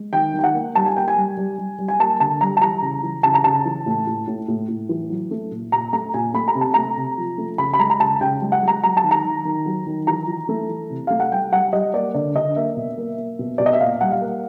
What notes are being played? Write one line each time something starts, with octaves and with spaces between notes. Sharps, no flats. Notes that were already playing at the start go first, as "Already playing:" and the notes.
Already playing: G#3
D#3 G5
D#3 G5
F#5
A#3
G3 A5
G#5
A#3 G5
G#5
G3
G3
G3
G3
G#5
A#3 A5
D3 A5
G3 A#5
A5
E3 A#5
C#3
E3
C#3 A5
A#5
C#3 A5
E3
A2
A2
A2
A2
A2
E3
F#3
A3
A#2
A#2 A#5
A3 A#5
A#2 G#5
A3 B5
A#5
C3
A5
A3 A#5
C3
F3
A3
C#3 B5
B5
G#3 A#5
A#5
C#3 A5
C#3 G5
G#3
F#5
G#3 A#5
F#3 A#5
A5
D#3
A#5
D#3
D#3
F#3
D#3
E3 A#5
E3
A3
E3
C3
A3 F5
F#5
G3 G5
G3 F#5
G3 D#5
A#3 D5
D3 D5
D3 D#5
A#3 E5
B2
A#3
A#3
B2
B2 D5
D#5
E5
A#2 F5
G3 F#5
F5
A#3